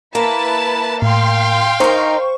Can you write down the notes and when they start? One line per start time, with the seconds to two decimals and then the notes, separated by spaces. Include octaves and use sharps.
0.15 A#3 E4 B4 A5
1.02 A2 F5 G5 C6
1.80 D#4 A#4 C5 C#6